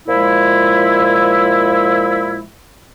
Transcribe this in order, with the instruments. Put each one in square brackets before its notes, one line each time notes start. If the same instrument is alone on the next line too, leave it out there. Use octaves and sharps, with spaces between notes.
[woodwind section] A#2 F3 G#3 E4